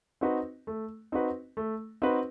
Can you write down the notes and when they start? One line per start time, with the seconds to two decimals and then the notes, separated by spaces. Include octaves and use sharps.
0.21 C4 D#4 F#4 B4
0.67 A3
1.12 C4 D#4 F#4 B4
1.57 A3
2.02 C4 D#4 F#4 B4